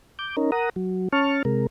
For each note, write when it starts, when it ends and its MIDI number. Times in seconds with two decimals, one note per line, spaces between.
0.19 0.36 86
0.19 0.36 91
0.37 0.51 61
0.37 0.51 63
0.37 0.51 70
0.52 0.69 70
0.52 0.69 78
0.52 0.69 82
0.52 0.69 87
0.76 1.08 54
1.13 1.43 61
1.13 1.43 81
1.13 1.43 85
1.13 1.43 89
1.45 1.67 48
1.45 1.67 56
1.45 1.67 70